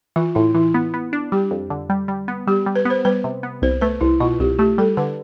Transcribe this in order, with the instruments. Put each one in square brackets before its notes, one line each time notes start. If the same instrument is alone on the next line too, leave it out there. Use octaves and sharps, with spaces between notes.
[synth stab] E3 [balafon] F4
[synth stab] A2 [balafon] E4
[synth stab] E3 [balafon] E4
[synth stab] B3
B3
D4
[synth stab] G3 [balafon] G4
[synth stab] F2
D3
G3
G3
B3
[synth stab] G3 [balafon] G4
[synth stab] G3
[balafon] B4
[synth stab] B3 [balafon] C5
[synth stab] G3 [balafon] B4
[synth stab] C3
B3
[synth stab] C2 [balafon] C5
[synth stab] A3 [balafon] B4
[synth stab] C2 [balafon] E4
[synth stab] B2 [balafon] F4
[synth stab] C2 [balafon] G4
[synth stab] A3 [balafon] G4
[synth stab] G3 [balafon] A4
[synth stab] D3 [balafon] B4